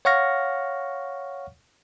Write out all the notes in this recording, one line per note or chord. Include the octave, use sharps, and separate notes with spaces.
C#5 F5 F#5 C#6 F6 A#6